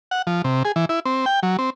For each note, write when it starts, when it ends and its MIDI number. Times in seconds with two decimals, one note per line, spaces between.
0.11 0.22 78
0.27 0.42 53
0.44 0.63 48
0.65 0.72 68
0.76 0.85 52
0.89 1.00 64
1.05 1.25 60
1.26 1.40 79
1.43 1.57 54
1.59 1.70 60